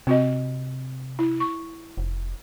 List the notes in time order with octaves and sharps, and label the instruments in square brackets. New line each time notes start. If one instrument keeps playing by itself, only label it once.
[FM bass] C3 [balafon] C4 F#4 D#5
[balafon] E4
C#6
[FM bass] F1